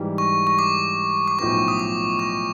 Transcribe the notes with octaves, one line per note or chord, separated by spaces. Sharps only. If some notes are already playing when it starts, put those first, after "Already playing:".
Already playing: G#2 E3 G3
C#6
C#6
D6
D6
B1 A2 F3 C#6
D#6
D6
C#6